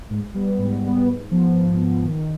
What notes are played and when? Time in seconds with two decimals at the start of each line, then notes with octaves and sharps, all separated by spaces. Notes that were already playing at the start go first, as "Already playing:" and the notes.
0.10 G#2
0.35 G3 B3
0.59 G#2
0.83 G3 B3
1.08 G#2
1.31 F3 B3
1.57 G#2
1.81 F3 B3
2.05 D#3